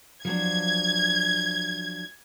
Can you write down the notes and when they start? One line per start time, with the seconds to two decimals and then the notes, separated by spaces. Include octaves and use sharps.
0.25 F3 F#3 D4 G#6